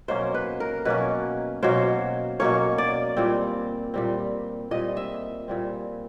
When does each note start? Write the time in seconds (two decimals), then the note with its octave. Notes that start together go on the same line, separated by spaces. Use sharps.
0.08 B2 F#3 A#3 C#4 C5
0.34 B4
0.60 A#4
0.85 B2 F#3 A#3 C#4 B4
1.63 B2 F#3 A#3 C#4 C5
2.39 B2 F#3 A#3 C#4 C#5
2.78 D5
3.17 A#2 G3 C4
3.94 A#2 G3 C4
4.71 A#2 G3 C4 D#5
4.97 E5
5.48 A#2 G3 C4